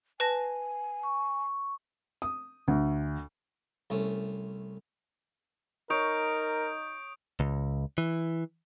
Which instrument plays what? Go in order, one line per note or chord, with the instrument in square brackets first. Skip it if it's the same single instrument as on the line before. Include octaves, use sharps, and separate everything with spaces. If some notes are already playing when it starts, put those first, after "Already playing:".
[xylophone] B4 A5 A#6 [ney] G#5
[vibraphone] C#6
[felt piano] D#6
D2
[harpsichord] C2 A3 C#4
[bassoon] D#4 [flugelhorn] A#4 [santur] C#5 [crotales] D#6 G6 D7
[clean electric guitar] C#2
E3